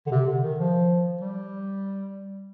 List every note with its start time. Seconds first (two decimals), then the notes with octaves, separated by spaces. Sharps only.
0.07 D3
0.12 C3
0.27 D3
0.43 D#3
0.59 F3
1.21 G3